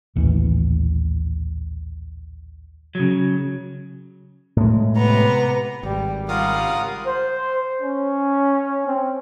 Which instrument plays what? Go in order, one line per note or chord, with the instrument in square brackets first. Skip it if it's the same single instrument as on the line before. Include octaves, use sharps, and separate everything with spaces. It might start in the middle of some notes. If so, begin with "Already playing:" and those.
[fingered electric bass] A#1 D#2 A2 E3
[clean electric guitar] C#3 F#3
[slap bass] A2 G#3
[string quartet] C3 B3 A#5
[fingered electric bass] G#1 [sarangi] G3
[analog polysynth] C#3 G3 F5 [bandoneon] F4 A#4 D#6 [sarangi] F#5
[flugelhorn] C5
C#4
C4